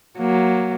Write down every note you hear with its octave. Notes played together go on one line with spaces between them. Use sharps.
F#3 A#3